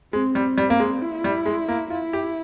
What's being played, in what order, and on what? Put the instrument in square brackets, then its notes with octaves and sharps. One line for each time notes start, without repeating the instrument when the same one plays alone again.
[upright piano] G#3 [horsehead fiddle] C4
[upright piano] G3
G3
A#3
G#3
[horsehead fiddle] E4
[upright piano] G3
G#3
A#3
[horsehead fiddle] E4 [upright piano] F4
[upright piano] G4